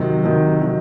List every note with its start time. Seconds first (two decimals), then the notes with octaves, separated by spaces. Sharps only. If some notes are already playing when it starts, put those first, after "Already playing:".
Already playing: C3 D#3 F#3
0.24 C3 D#3 F#3
0.62 C3 D#3 F#3